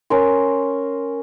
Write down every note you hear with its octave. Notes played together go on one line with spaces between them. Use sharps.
C#4 A#4 C6